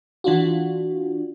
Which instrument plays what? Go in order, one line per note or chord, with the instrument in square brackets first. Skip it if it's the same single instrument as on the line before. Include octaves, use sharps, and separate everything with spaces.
[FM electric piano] E3 D4 F4 F#4